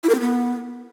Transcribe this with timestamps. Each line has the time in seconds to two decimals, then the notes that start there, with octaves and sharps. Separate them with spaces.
0.03 E4
0.09 A#4
0.15 C4
0.20 B3